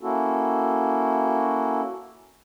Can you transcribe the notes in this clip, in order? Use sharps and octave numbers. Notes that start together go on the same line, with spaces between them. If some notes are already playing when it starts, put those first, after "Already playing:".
A#3 C#4 E4 F#4 A4